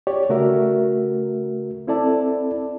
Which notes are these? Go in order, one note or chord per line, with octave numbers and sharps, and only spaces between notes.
G4 C#5 D5
C#3 A3 F#4 A#4 E5
C4 E4 A4 D5 A5